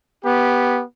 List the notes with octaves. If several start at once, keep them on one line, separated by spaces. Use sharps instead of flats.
B3 G4